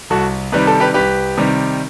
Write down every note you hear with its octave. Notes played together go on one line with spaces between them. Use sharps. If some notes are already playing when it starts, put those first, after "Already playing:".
C2 F#4 A4
C3 D#3 G3 B4
A4
G4 B4
C2 G4 B4
C3 D#3 G3